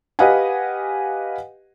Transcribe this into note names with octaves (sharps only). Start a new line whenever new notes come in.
G4 B4 D#5 F5 F#5 G#5